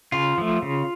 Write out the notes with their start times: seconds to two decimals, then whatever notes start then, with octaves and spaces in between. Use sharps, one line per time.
0.12 C#3 F4
0.38 F3 A3
0.62 C#3